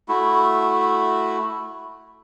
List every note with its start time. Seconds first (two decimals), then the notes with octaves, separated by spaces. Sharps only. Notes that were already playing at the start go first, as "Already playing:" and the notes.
0.08 A3 E4 F#4